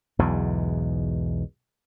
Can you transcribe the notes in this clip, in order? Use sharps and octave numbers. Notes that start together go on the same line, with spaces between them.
B1 E2 G#2 B2